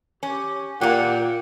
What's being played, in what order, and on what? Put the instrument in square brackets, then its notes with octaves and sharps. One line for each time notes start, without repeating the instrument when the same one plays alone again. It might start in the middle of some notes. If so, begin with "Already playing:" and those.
[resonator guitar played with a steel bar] C#4 [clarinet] G4
[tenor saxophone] A#2 [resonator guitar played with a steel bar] A#3 G4 [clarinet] F#5